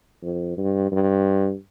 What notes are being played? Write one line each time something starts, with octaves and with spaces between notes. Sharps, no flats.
F2
G2
G2